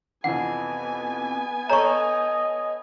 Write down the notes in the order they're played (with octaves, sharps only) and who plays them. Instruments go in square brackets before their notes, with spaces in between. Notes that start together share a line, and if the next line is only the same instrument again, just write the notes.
[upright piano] F2 C3 E3 [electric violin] B3 G#5 [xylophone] F#5
[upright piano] A4 C#5 G6 [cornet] D#5 [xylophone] A#5 C#6